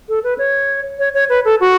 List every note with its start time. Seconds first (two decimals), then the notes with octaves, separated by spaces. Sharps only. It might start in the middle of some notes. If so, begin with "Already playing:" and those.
0.09 A4
0.24 B4
0.38 C#5
0.99 C#5
1.14 C#5
1.29 B4
1.45 A4
1.60 F#4